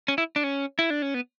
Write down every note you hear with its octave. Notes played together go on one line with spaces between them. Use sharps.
C#4
E4
D4
C#4
E4
D4
C#4
B3